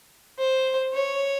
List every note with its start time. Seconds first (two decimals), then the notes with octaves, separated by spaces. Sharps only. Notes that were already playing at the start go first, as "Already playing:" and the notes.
0.39 C5
0.93 C#5